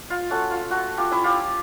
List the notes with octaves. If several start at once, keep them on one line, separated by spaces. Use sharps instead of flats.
F4
A3 C#4 F#4
F4
A3 F#4
F4 G4
C#4 E4
F4 G4